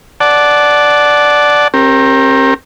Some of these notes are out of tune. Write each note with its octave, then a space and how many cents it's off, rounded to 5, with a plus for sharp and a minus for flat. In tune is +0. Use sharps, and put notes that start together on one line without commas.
D5 +0 F#5 +0 A5 -15
C4 +45 G4 +0 A#4 +0